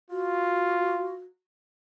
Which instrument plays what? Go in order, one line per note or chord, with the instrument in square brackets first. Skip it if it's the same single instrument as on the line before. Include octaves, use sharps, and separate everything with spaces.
[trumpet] F4 [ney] F#4